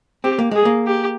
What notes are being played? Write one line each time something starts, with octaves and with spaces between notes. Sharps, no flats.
C4 G4
A#3
G#3 G#4
A#3
G4